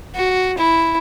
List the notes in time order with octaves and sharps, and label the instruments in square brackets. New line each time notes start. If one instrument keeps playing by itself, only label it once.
[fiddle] F#4
E4